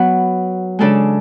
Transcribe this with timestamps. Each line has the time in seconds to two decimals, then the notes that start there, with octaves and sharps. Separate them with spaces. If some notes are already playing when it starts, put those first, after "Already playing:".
Already playing: F#3 B3 F#4 B4
0.79 C#3 G#3 D4 A4 D5